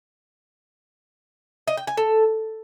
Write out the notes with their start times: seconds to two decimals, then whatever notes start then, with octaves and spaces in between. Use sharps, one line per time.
1.67 D#5
1.77 G5
1.87 G#5
1.97 A4